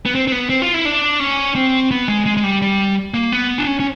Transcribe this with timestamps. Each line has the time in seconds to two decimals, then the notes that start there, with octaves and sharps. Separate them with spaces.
0.06 B3
0.15 C4
0.28 C4
0.32 B3
0.50 C4
0.62 F4
0.74 E4
0.85 D4
1.20 C#4
1.55 C4
1.91 B3
2.08 G#3
2.26 G#3
2.37 G#3
2.44 G3
2.62 G3
3.14 A#3
3.32 B3
3.58 D4
3.67 C#4
3.80 C#4